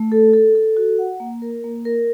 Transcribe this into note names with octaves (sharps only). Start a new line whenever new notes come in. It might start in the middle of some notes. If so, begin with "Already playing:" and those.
Already playing: A3
A4
A4
A4
F#4
F#5
A#3
A#4
A#3
A#4